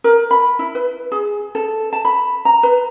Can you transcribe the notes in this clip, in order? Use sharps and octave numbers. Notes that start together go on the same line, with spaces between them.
A#4
B5
E4
B4
G#4
A4
A5
B5
A#5
B4